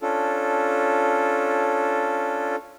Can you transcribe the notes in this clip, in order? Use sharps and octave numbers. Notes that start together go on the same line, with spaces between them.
C#4 D4 F4 A4